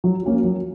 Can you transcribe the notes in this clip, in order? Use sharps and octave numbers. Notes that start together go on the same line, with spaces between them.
F#3
A#3 C#4 F#4
F#3